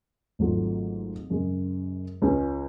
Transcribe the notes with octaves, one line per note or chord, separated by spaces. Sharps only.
G#1 G#2 F#3 A3 F4
F#2 C#3 G#3
C#2 C#3 G#3 C#4